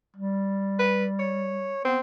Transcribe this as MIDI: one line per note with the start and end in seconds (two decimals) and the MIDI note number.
0.16 1.75 55
0.79 1.05 71
1.19 1.83 73
1.85 1.99 59
1.85 2.00 60